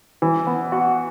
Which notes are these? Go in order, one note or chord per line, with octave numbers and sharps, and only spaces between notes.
E3
B3
F#4